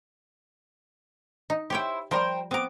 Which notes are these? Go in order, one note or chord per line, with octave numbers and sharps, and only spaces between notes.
D#4
E4 G4 C5 C#5 G5
F3 G3 A#4 C5 G5 A#5
B3 C4 A#5 D6